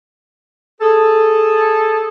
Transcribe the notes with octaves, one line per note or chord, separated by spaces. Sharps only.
G#4 A4